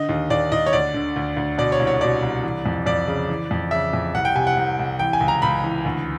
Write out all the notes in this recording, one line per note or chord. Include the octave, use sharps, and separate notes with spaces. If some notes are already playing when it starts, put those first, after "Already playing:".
Already playing: D3 D#5
D#2
D#2 D5
D#2 D#5
C#5
D2 D5
D3
D2
D2
B2 D5
C#5
C2
C#5
B2 D5
C2
E3
F2
F2 D5
C#3
E3
F2
C#3 E5
F2
C2 F#5
G5
C3 G#5
F#5
C2
C2
E3 G5
G#5
C#2
A#5
C#2 B5
E3
D2